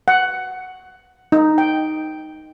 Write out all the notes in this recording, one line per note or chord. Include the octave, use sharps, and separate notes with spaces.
F#5
D#4
G5